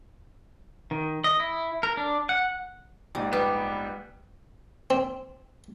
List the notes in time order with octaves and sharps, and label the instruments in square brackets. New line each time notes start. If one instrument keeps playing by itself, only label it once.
[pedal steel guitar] D#3
D#5
E4
A#4
D4
F#5
[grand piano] A#1 G#2 [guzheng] G3
[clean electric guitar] G3 B3 [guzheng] G4 [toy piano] B4
[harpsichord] C4